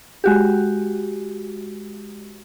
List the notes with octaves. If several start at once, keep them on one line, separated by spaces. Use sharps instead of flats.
G#3 F#4 G4